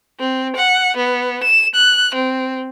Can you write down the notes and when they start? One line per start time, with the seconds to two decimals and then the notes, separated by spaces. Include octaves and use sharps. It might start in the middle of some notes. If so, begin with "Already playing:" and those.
0.19 C4
0.56 F#5
0.96 B3
1.43 E7
1.75 F#6
2.15 C4